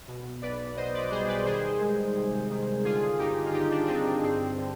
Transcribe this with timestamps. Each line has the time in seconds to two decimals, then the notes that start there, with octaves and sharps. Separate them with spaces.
0.07 B2
0.42 B1 B4 D5
0.77 B2 C5 D#5
0.94 B4 D5
1.11 G3 G#4 C5
1.28 B4 D5
1.45 D#3 G#4 C5
1.80 G#3
2.15 C3
2.50 D#3
2.84 D3 F4 G#4
3.18 G1 D#4 G4
3.46 F4
3.53 G1 D#4 G4
3.71 D4
3.84 D4
3.88 D3 C4 D#4
4.05 D4
4.23 G2 C4
4.58 D3